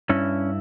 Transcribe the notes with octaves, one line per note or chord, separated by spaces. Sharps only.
G2 C#4 E4